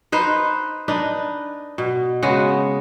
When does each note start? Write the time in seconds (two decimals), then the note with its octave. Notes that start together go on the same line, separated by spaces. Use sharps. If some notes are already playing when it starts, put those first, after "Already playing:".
0.12 D#4 B4 C5
0.88 D4 D#4 B4
1.78 B2
2.23 C#3 G#3 B3 F#4